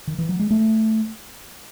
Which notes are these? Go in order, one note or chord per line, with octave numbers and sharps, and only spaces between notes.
D#3
E3
F#3
G#3
A3